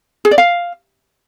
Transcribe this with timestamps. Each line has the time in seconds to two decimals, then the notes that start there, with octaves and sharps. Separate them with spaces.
0.25 G#4
0.31 D5
0.38 F5